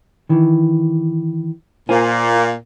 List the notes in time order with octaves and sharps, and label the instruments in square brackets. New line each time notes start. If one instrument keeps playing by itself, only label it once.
[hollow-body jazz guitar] D#3 E3
[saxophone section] A#2 A#3 [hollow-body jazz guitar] F4 C5 G#5